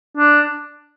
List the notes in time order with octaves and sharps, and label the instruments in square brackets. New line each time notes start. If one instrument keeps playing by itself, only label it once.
[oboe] D4